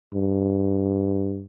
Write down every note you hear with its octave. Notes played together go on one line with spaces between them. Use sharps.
G2